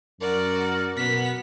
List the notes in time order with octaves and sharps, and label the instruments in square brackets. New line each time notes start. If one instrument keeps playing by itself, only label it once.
[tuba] F#2 [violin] F#4 D5 [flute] A#4
[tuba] B2 [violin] B3 B6